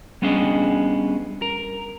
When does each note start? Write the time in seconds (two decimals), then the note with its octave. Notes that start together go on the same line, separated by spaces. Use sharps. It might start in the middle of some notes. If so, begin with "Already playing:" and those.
0.22 G3 B3 C#4 D4 G#4 D#5
1.42 A#4